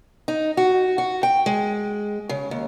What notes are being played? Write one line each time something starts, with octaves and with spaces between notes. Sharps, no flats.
D#4
F#4
F#4
G5
G#3
C#3
D#2